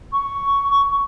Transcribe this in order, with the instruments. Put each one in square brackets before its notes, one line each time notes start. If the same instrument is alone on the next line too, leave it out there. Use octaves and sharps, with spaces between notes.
[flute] C#6